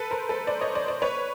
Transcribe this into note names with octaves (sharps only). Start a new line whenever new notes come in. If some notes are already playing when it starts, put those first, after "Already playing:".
Already playing: A4 B4
A#4 C5
A4 B4
C5 D5
C#5 D#5
C5 D5
C5 D5
B4 C#5